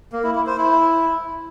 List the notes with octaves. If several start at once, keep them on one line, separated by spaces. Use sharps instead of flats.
A#3
E4
E4
C5
E4